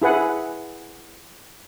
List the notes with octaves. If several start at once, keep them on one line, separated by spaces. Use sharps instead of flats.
E4 G#4 B4 F#5